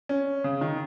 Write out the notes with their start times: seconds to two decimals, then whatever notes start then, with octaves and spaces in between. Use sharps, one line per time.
0.09 C#4
0.44 C#3
0.61 D#3